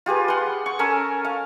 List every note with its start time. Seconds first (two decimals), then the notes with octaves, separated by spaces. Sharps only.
0.06 F4 G4 G#4 B4
0.28 F#5 C6
0.66 C#6
0.79 C#4 A4 A#4 G#5
1.25 F5